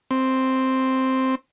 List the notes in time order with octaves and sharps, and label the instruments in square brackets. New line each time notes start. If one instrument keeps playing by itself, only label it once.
[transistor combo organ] C4